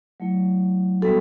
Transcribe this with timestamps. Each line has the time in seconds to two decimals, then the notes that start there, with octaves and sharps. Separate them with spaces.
0.20 F#3 A3 E4
1.01 G3 B3 D4 F#4 A4